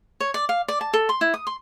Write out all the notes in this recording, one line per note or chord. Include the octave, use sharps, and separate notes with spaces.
C#5
D5
F5
D5
A5
A4
C6
E4
D#6
C6